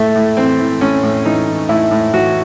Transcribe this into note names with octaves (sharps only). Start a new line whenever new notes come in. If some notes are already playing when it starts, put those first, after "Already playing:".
Already playing: A2 A3
A2
E3 C4
E3
A2 C#4
A2
E3 D#4
E3
A2 E4
A2
E3 F#4